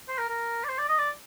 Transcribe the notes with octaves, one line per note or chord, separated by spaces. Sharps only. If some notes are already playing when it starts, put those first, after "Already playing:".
C5
A#4
A#4
D5
C5
D5
D#5
D5